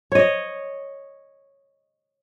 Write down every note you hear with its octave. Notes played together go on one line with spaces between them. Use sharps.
C#5 D#5